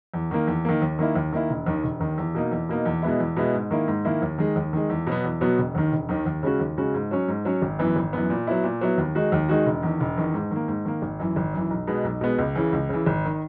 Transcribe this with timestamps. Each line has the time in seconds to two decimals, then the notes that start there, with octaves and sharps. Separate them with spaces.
0.14 E2
0.31 D#3 A#3
0.47 E2
0.65 D#3 A#3
0.82 D#2
0.99 D#3 A#3 E4
1.15 D#2
1.33 D#3 A#3 E4
1.50 E1
1.66 D#2 D#3
1.84 E1
2.00 D#2 D#3
2.18 E2
2.35 B2 A#3 D#4
2.51 E2
2.69 B2 A#3 D#4
2.86 E2
3.02 B2 G#3 B3 E4
3.20 E2
3.36 B2 G#3 B3 E4
3.54 G#2
3.71 D#3 A#3 E4
3.88 G#2
4.05 D#3 A#3 E4
4.22 D#2
4.38 D#3 G#3
4.56 D#2
4.73 D#3 G#3
4.90 E2
5.07 B2 F#3 B3
5.24 E2
5.41 B2 F#3 B3
5.58 E1
5.75 D#2 D#3
5.92 E1
6.09 D#2 D#3
6.26 D#2
6.43 C#3 G#3 C#4 F#4
6.60 D#2
6.77 C#3 G#3 C#4 F#4
6.94 G#2
7.11 F#3 C#4
7.28 G#2
7.45 F#3 C#4
7.62 G#1
7.79 F#2 E3 B3
7.96 G#1
8.13 F#2 E3 B3
8.30 A#2
8.47 F#3 B3 E4
8.64 A#2
8.81 F#3 B3 E4
8.98 D#2
9.15 D#3 G#3 D#4 F#4
9.32 D#2
9.49 D#3 G#3 D#4 F#4
9.66 E1
9.83 E2 D#3
10.00 E1
10.17 E2 D#3
10.34 G#2
10.51 D#3 A#3
10.68 G#2
10.85 D#3 A#3
11.02 G#1
11.19 F#2 E3
11.36 G#1
11.54 F#2 E3
11.70 B1
11.87 B2 G#3 B3
12.04 B1
12.21 B2 G#3 B3
12.38 C#2
12.55 C#3 E3
12.72 C#2
12.89 C#3 E3
13.06 G#1
13.25 D#3